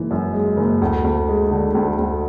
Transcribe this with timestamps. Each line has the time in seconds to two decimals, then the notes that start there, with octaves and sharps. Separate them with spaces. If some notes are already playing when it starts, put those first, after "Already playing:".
Already playing: F#1 E3 G#3
0.11 F#2
0.34 G#3
0.57 F#1
0.82 D2
1.04 D2
1.28 G#3
1.51 D3
1.75 D2
1.99 D2